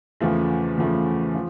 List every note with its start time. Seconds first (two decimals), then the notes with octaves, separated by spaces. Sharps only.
0.21 E2 C#3 F3 A3
0.78 E2 C#3 F3 A3
1.35 F3